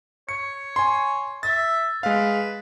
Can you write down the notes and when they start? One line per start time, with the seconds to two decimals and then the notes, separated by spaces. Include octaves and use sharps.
0.29 C#5 C#7
0.76 G#5 C6
1.43 E5 A6
2.03 G#3 B4 F5